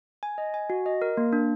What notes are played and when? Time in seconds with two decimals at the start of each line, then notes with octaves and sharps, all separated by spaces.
0.23 G#5
0.38 D#5
0.54 G#5
0.70 F#4
0.86 D#5
1.02 A#4
1.17 A#3
1.33 D4